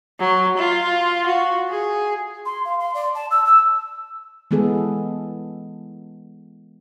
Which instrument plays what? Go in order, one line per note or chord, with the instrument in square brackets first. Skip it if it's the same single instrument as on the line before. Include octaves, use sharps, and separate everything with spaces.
[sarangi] F#3
F4
F#4
G#4
[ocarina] C6
F5
C6
D5
A5
E6
E6
[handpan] E3 G#3 B3 G#4 A4